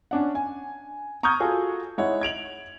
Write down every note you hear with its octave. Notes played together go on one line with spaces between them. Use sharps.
C#4 D4 F#5
G#5
A#5 C#6 D#6 F6 G6 G#6
F4 F#4 G#4 A4
G#3 D#4 E4 C#5 F#5
G#6 D7 F7 F#7